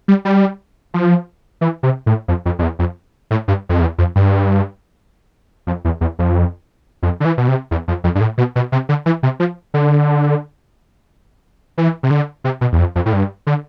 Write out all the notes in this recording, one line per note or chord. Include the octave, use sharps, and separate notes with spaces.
G3
G3
F3
E3
C3
A2
F2
F2
F2
E2
F2
A2
G2
F2
E2
F2
G2
F2
E2
E2
F2
F2
D3
E3
B2
C3
E2
F2
F2
G2
A2
B2
B2
C3
D3
E3
C3
F3
D3
E3
C3
D3
C3
B2
E2
F2
F2
A2
G2
D3